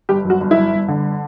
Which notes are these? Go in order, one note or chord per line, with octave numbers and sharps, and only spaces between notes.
G1 G4
F#2
F#4
G1
E4
G1
G1
D3